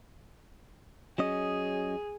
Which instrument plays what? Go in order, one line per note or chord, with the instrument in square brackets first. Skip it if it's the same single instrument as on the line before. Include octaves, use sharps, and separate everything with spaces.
[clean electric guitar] F#3 C#4 D#5 [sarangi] G#4